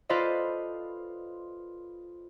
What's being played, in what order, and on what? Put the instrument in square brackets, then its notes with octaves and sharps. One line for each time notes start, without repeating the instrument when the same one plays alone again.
[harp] F4 A4 B4 C5 D5 D#5